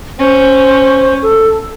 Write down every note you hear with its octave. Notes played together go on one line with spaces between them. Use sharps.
C#4 C5
A4